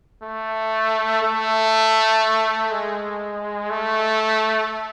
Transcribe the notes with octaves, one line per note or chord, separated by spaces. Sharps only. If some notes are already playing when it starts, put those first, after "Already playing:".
A3
A3
G#3
A3